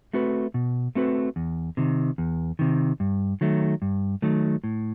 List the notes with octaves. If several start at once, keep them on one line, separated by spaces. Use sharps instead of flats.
A3 C4 F#4 B4
B2
A3 C4 F#4 B4
E2
C3 D#3
E2
C3 D#3
G2
D#3 F#3 A3
G2
D#3 F#3 A3
A2